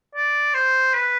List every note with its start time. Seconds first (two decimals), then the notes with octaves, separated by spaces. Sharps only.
0.15 D5
0.54 C5
0.94 B4